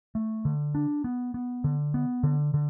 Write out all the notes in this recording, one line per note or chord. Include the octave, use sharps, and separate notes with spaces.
A3
D3
D4
B3
B3
D3
B3
D3
D3